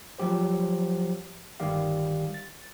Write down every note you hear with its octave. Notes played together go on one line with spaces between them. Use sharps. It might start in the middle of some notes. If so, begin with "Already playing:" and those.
F3 F#3 G4 C5
G1 D#3 G3 G4 F5
A6